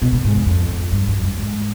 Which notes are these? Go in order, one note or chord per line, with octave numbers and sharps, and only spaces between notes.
B2
A#2
G#2
F2
F2
G2
F#2
G2
G#2